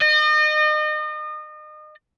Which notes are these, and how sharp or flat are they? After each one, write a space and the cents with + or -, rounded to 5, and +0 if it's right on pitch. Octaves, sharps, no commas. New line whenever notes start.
D#5 -35